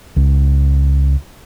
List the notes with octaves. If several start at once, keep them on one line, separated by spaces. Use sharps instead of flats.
C#2